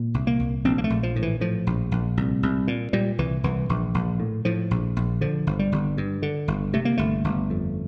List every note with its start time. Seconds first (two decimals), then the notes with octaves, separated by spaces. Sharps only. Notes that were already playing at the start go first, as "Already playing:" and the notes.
Already playing: A#2
0.14 C2
0.27 A#3
0.39 C2
0.65 A#1 C4
0.78 A#3
0.84 A3
0.90 A#1
1.03 F3
1.16 A2
1.22 E3
1.41 A2 F3
1.67 A#1
1.91 A#1
2.17 C2
2.43 C2
2.68 A#2
2.93 A#2 G3
3.18 C2 E3
3.44 C2 E3
3.69 A#1
3.94 A#1
4.20 A2
4.45 A2 F3
4.71 A#1
4.96 A#1
5.21 D3 F3
5.47 G1
5.59 G3
5.72 G1
5.98 G2
6.22 D3
6.48 G1
6.73 C3 A3
6.85 A#3
6.97 G1 A3
7.24 G1
7.50 F2